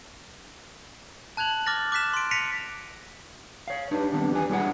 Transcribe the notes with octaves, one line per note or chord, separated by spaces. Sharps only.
A5 F#6 G#6 F7 F#7
D6 F6 A6 A#6
D6 F#6 B6 E7
C6 D7
A#6 B6 C#7 D#7 F7
C#5 F5
D4 D#4 G4 B4
D#3 G3 B3 C4 D4
E2 G4 B4 G#5
G3 D4 E4 G#4 C#5 F#5